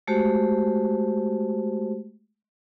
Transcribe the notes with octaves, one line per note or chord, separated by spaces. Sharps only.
G#3 A3 F#4 G4 C5